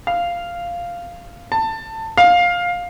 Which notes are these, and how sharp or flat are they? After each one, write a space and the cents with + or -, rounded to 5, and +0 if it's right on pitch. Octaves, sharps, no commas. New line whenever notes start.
F5 -5
A5 +20
F5 +15